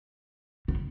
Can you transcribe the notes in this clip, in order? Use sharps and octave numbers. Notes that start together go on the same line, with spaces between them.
C#3